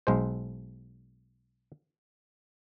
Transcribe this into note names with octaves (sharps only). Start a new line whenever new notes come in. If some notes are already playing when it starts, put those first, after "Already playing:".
B1 G#3 C5